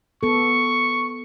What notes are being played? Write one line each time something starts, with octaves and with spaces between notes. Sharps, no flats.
B3 A4 C#6